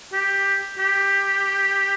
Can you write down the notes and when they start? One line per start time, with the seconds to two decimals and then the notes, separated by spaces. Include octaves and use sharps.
0.13 G4
0.79 G4